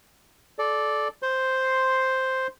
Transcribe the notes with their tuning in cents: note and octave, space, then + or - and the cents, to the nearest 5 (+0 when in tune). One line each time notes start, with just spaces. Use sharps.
A4 -30 D5 +0
C5 +0 C6 +0